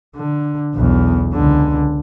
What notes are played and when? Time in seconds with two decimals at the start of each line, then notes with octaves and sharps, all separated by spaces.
0.16 D3
0.75 B1 E2
1.33 C#2 D3